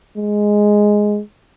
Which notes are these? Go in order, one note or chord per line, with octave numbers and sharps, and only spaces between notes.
G#3